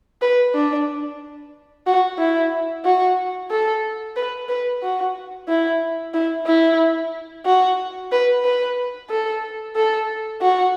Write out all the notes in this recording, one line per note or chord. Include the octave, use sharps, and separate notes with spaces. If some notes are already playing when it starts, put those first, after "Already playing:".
B4
D4
F#4
E4
F#4
A4
B4
B4
F#4
E4
E4
E4
F#4
B4
B4
A4
A4
F#4